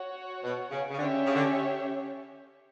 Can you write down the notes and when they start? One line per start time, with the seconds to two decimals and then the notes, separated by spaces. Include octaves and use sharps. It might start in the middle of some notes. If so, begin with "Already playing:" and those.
Already playing: F#4 C#5 F#5
0.44 B2
0.71 C#3
0.90 C#3
0.98 D3 C#4 G4 C#5 E5
1.26 C#3
1.35 D3